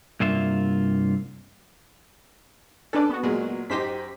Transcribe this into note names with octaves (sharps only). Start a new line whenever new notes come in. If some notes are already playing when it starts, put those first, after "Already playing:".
C2 G2 A#3 F4 E5
C#4 D4 A4 B4 D5 A5
B3 F#4
A#2 F#3 G#3
F#2 D#4 G4 C5 B6